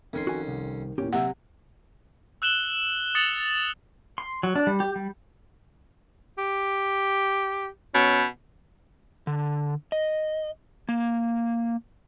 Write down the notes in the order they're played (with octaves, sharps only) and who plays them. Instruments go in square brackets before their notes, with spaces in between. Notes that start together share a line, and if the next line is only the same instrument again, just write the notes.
[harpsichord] F2 C#4 C6 [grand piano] D#3
[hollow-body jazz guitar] F#4 G#5
C2
[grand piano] E2 A#2 E3 [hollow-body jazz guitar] C#4 G4
[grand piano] C3 [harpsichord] F#3 [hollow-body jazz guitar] A#3 E5 [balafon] F#5
[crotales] E6 F#6 E7 F#7 G7
D#6 A6 C#7 F7 F#7
[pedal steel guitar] C6
F#3
D4
G3
G4
G3
[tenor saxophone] G4
[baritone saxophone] B2 [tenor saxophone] C#4
[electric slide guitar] D3
D#5
A#3